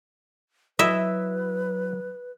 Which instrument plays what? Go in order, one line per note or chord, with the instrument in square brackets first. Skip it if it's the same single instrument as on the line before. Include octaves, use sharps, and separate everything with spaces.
[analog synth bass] F#3 [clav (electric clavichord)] E4 D#5 [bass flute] B4 [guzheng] E5